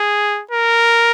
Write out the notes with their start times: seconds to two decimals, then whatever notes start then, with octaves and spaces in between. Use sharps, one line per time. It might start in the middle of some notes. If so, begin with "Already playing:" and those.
Already playing: G#4
0.51 A#4